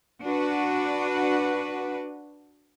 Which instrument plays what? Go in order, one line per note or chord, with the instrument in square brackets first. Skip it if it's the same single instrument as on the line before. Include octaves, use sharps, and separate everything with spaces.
[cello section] D4 F#4 B4